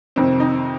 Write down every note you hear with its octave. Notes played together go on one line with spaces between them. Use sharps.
F2 C3 D#3 C4
D#4